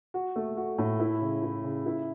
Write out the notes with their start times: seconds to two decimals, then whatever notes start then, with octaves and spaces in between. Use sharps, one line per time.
0.14 F#4
0.36 A3
0.57 F#4
0.78 A2
0.99 E4
1.22 C#3
1.43 E4
1.64 C#3
1.86 E4